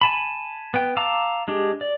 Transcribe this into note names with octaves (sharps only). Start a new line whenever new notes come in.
G#5 A5 B5
B3 G5
F5 A5 A#5 D6 E6
G#3 D4 G4
D5